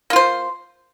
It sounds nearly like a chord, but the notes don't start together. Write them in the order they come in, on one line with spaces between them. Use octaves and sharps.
A#3 F4 C5